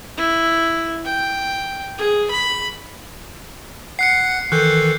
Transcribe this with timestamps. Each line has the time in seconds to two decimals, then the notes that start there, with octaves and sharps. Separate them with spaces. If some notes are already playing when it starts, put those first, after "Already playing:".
0.18 E4
1.05 G5
1.99 G#4
2.31 B5
3.99 F#5 F#6 C7 C#7
4.52 D#3 E3 A4 F#6 G6